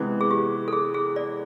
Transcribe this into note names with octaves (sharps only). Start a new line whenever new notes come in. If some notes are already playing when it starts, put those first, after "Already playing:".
Already playing: C3 E3 G#3 B3
G#4
G4
A4
G#4
G#4
D5